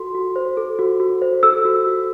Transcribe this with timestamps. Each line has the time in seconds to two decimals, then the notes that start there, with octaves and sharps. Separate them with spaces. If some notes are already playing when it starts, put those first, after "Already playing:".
Already playing: F#4 A4 C6
0.15 F#4
0.36 C5
0.57 A4
0.79 F#4
1.00 F#4
1.22 C5
1.43 A4 E6
1.65 F#4
1.87 F#4